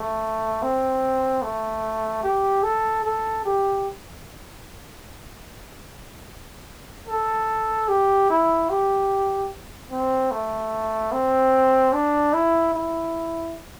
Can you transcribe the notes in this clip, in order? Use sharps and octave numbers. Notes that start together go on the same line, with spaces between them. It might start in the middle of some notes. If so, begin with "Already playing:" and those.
Already playing: A3
C4
A3
G4
A4
A4
G4
A4
G4
E4
G4
C4
A3
C4
D4
E4
E4